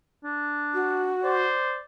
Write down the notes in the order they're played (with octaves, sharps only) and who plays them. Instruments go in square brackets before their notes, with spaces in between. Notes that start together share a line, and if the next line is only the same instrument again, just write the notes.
[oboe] D4
[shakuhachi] F#4
[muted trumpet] C5 [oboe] D5